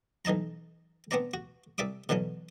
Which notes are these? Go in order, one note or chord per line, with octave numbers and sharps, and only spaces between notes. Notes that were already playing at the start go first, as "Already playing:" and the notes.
B1 E3 D#4 A5 A#5
B3 C4 D4 D5 A#5
F#4
C2 D5 E5 D6 D#6
B2 D3 E3 F#3 C#4